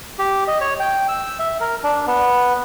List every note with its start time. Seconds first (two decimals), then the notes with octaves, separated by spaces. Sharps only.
0.19 G4
0.48 D#5
0.61 C#5
0.80 G5
1.08 E6
1.39 E5
1.60 A#4
1.84 D4
2.07 B3